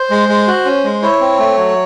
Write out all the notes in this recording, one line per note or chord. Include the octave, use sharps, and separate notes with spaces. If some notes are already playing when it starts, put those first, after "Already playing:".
Already playing: C5
G#3
G#3
F#4
C#4
G#3
E4 C#5
C4
A3
F#3